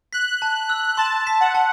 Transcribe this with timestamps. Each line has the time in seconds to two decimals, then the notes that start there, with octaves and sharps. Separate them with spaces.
0.13 F#6 B6
0.42 A5
0.70 E6
0.97 A5 C6
1.27 B6
1.40 F#5
1.55 A5